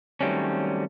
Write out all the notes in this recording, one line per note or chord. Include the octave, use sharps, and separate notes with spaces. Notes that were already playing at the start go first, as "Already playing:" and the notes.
D#3 F#3 G3 A3 C4 C#4